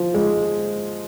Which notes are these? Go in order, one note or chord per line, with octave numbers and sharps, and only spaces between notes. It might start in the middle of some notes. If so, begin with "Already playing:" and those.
Already playing: F3
G#3